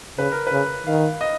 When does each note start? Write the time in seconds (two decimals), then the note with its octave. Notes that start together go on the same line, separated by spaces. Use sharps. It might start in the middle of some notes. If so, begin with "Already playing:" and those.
0.18 C#3 B4
0.32 A#4
0.47 B4
0.52 C#3
0.87 D#3 F5
1.21 D#5